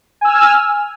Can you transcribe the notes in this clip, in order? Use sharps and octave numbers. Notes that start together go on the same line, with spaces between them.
G#5 E6 F6